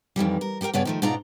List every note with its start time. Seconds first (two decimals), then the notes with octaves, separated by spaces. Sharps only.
0.16 F2 D#3 E3 G3
0.41 A#4
0.61 G3 G4 A4 A#4 G5
0.74 G2 C#3 B3 D4 C#5 D5
0.85 D#3 F3 A3
1.02 G#2 B2 D4 D#4 F4 A#5